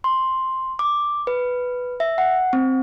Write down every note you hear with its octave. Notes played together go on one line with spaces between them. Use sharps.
C6
D6
B4
E5
F#5
C4